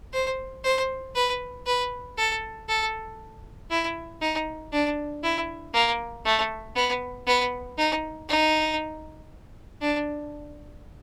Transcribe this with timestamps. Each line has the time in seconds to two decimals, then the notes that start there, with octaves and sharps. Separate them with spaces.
0.13 C5
0.64 C5
1.15 B4
1.66 B4
2.18 A4
2.69 A4
3.70 E4
4.21 D#4
4.72 D4
5.23 E4
5.74 A#3
6.25 A3
6.76 B3
7.27 B3
7.78 D#4
8.29 D#4
9.82 D4